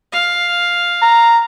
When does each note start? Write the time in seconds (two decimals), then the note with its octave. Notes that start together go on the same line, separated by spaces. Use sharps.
0.12 F5
1.02 A#5